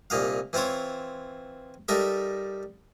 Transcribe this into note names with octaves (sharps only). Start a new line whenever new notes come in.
C2 A#2 D#4 F5
E3 C4 F4 C5 C#5
G3 D#4 A4 A#4 E5